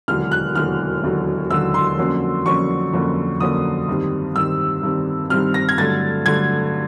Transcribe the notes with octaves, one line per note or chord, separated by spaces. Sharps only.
E1 D#2 D3 F#3 F6
F#6
E1 D#2 D3 F#3 F6
E1 D#2 D3 F#3
E1 D#2 D3 F#3 E6
C6
F2 D3 F#3 A#3 C#4
F2 D3 F#3 A#3 C#4 C#6
F2 D3 F#3 A#3 C#4
F2 D3 F#3 A#3 C#4 D#6
G2 D#3 G3 C4
G2 D#3 G3 C4 E6
G2 D#3 G3 C4
G2 D#3 G3 C4 F6
A#6
G#6
G2 D3 F#3 A3 A6
G2 D3 F#3 A3 G#6